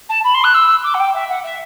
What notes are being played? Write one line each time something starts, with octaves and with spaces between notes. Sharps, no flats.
A5
B5
C6
F#6
E6
D6
F#5
G5
E5
F#5
E5